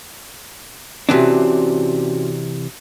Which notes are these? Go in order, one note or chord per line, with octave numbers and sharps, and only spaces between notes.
C3 E3 C#4 D4 F#4